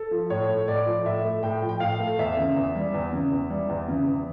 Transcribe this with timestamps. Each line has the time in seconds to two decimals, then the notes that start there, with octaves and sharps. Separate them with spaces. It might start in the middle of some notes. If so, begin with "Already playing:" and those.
Already playing: A4
0.11 F3
0.30 A2 C#5
0.48 A3
0.68 A2 D5
0.86 F3
1.06 A2 E5
1.24 A3
1.43 A2 G5
1.62 F3
1.69 G5
1.80 A2 F5
2.00 A3
2.19 E2 E5
2.37 C#3
2.56 E2
2.75 G3
2.94 E2
3.13 C#3
3.32 E2
3.50 G3
3.69 E2
3.88 C#3
4.07 E2